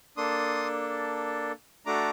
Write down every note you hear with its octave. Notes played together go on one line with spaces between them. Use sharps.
A#3 D4 A4 C6 D#6
A3 D4 F#4 A4 A#5 D6